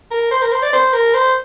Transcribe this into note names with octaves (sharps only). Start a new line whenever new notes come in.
A#4
C5
A#4
C5
D5
C5
A#4
C5